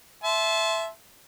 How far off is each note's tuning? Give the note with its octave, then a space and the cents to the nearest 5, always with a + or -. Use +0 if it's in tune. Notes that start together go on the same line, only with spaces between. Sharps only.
E5 +5 A5 -30 C6 +0